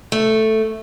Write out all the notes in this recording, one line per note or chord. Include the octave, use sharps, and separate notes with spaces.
A3